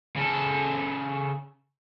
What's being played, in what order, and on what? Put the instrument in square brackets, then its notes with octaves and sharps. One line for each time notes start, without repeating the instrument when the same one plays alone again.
[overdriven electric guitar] C#3 A4